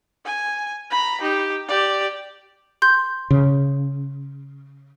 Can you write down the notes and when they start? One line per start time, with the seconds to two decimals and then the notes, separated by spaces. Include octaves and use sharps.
0.25 G#5
0.91 A#5 B5
1.21 D#4 G4
1.68 G4 D5
2.82 C6 G6
3.31 C#3